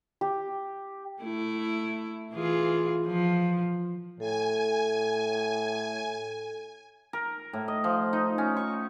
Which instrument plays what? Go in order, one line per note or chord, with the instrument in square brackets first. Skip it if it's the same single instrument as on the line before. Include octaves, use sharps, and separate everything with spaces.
[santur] G4
[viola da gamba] A3 E4
E3 F4 G#4
F3
[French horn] A2 [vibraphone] A4 [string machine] G#5
[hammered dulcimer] A#4
A2
D#5
F3
D#4
C#4
C#6